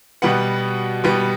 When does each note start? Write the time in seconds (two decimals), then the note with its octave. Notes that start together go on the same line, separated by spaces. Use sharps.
0.22 B2 G3 B3 F#5
1.04 B2 G3 B3